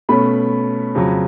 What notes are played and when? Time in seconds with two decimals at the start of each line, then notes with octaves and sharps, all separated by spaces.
0.09 B2 A3 C#4 B5
0.95 F2 C#3 F#3